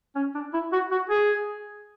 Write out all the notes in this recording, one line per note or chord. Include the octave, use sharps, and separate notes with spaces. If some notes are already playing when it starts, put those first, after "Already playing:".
C#4
D4
E4
F#4
F#4
G#4